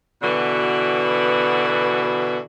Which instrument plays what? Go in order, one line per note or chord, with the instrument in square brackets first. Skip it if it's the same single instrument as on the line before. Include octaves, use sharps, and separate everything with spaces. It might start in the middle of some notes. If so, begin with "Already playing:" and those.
[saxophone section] B2 D3 E3 B3 F#4